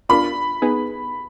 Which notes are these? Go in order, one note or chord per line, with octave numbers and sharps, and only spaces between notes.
B3 D4 F4 A#4 D5 B5
B3 D#4 G#4 B4